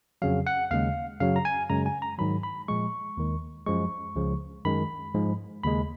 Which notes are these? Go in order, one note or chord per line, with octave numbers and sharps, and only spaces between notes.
F2 C#3 F#3 F5
F#5
D#2 C#3 G#3 F5
F#2 C#3 F#3 F5
A#5
G#5
F#2 C#3 G#3 A#5
G#5
A#5
G#2 D#3 F#3 B5
B5
A#2 F3 G#3 C#6
D#2 D#3 G#3
F#2 F3 G#3 C#6
C#2 C#3 F3 G#3
F#2 D#3 G#3 B5
G#2 F3 G#3
D#2 C#3 G#3 B5